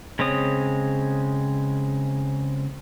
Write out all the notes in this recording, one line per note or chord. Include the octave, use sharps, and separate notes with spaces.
C#3 G#3 C4 C#5 D#6